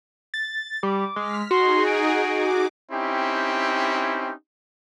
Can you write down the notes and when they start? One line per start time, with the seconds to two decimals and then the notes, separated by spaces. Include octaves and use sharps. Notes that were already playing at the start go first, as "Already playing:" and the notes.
0.34 A6
0.83 G3 D6
1.16 G#3 F6 B6
1.51 D#4 F#4 G#4 C6
1.87 D7
2.30 D6
2.92 C4 C#4 D#4 E4 G4